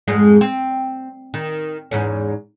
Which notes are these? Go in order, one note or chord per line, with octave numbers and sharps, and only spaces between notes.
F2 G#2 G#3
C4
D#3
E2 G#2 C#4